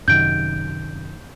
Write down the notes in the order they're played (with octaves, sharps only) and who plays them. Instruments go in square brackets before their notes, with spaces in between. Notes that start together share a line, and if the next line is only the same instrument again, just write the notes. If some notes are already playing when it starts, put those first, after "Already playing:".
[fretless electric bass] F#2 C3 D#3 [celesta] G6 D7